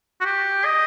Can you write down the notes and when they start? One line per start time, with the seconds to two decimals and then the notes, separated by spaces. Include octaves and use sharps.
0.21 F#4
0.26 G4
0.65 D#5